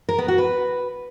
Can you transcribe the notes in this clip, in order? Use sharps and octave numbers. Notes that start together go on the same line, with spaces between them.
A#4
B3
F#4
B4